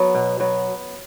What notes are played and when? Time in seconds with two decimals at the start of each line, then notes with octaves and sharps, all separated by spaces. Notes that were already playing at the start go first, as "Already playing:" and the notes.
Already playing: F#3 B3
0.15 B2
0.40 F#3 B3